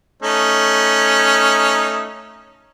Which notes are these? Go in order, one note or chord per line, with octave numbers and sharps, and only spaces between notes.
A3 C#4 D#4